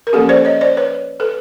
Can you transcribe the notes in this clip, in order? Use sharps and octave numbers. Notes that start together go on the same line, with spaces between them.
A#4
F3 A#3 C#4 G4 A4
C5 D5
C#5 D#5
C5 D5
B4 C#5
A4 B4